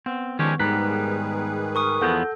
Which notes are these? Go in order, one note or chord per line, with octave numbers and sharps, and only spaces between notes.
B3 C4
D#3 F3 G#3 C#4 D4 G4 C#6
G#2 D#3 G3 G#4 B4 A#5 F#6 B6
A#4 C#6 D#6
E2 F3 B3 A4 F#5 G6